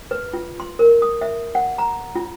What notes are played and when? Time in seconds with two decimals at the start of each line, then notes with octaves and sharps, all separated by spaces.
0.11 B4
0.33 F4
0.60 C6
0.79 A#4
1.02 D#6
1.21 E5
1.55 F#5
1.78 A#5
2.15 F4